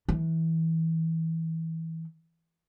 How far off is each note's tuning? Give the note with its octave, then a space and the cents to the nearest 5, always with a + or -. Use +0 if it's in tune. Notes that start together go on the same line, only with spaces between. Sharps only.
E3 -25